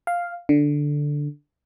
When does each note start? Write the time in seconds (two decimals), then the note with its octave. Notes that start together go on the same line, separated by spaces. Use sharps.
0.07 F5
0.49 D3